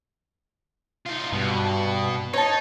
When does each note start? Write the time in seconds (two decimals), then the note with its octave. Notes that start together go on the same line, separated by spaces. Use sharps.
1.06 D#4 F4
1.32 G2 B2
2.33 D#4 C#5 A5